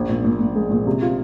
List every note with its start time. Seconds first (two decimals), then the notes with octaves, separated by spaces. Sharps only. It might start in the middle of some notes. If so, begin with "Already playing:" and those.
Already playing: A#1
0.09 A#2
0.24 A#2
0.40 A#2
0.56 G#3
0.71 A#2
0.86 C3
1.02 F4